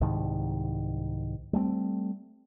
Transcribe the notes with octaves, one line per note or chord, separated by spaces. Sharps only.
C2 G#2 D#3
G3 A3 B3 C4